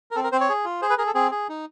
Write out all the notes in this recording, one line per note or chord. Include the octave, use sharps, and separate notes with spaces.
A#4
C4 A4
A#4
C4 C5
C#5
G#4
F4
G#4 C5
B4
G#4 A#4
A4
C4 G#4
G#4
D#4